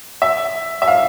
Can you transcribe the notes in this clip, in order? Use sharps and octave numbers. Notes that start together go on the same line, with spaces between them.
E5
E5
F5